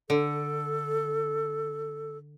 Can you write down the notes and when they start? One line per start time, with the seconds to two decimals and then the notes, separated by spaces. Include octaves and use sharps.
0.10 D3 A4